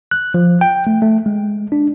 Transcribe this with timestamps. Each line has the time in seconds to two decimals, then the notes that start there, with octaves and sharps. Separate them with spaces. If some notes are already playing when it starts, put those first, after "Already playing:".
0.11 F#6
0.34 F3
0.61 G5
0.87 A3
1.02 A3
1.26 G#3
1.72 D4